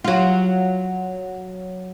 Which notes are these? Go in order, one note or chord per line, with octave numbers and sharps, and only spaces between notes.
F#3 F4